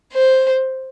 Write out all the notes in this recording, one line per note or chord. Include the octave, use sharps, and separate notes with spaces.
C5